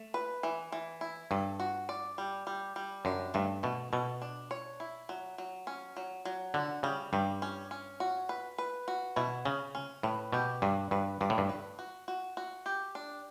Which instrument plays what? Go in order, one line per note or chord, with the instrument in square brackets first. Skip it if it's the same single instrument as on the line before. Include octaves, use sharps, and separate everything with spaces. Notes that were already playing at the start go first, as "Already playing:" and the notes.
Already playing: [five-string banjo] A3
B4
E3
E3
E4
[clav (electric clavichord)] G2 [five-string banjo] A4
[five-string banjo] F#4
D5
G3
G3
G3
[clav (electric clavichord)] F#2 [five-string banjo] D4
[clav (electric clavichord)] G2 [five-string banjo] A3
[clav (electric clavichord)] B2 [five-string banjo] A3
[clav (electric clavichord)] B2 [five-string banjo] A4
[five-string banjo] D4
C#5
E4
F#3
F#3
C#4
F#3
F#3
[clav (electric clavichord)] D3 [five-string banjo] F#4
[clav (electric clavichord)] C#3 [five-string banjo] G3
[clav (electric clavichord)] G2 [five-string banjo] G3
[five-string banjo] C#4
C#4
F#4
B4
B4
F#4
[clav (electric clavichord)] B2 [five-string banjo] E4
[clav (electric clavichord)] C#3 [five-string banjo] C#4
[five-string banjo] C#4
[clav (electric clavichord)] A2 [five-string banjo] B4
[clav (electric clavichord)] B2 [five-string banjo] G4
[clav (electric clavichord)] G2 [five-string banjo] D4
[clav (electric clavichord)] G2 [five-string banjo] B4
[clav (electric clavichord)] G2 [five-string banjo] D5
[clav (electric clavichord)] A2
G2
[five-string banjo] B4
F#4
F#4
F#4
G4
D4